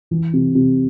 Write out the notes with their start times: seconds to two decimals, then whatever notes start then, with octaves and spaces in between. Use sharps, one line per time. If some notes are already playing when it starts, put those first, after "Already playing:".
0.11 E3
0.33 C3
0.55 C3